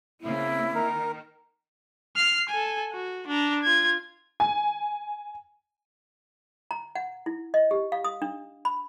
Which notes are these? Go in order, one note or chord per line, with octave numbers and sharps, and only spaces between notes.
C#3 A#3 C4 E4
D#3 A#4
F6 C7
A4 G#5
F#4
D4 A#5
F4 G#6
G#5
A#5
F#5
E4
D#5
G4
F5
D#6
D4
B5